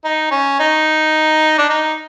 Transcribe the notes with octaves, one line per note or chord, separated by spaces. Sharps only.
D#4
C#4
D#4
D4
D#4